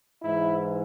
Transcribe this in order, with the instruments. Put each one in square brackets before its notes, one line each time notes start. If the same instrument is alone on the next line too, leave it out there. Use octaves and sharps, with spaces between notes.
[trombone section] G#2 E3 G#3 E4